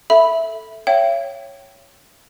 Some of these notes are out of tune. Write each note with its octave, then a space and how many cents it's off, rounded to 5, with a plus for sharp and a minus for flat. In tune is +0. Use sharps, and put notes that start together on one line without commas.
A4 +0 E5 +0 B5 +0
C#5 +0 E5 +45 G5 -25